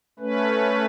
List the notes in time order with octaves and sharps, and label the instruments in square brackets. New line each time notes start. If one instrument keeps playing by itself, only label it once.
[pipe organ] A3 C#4 B4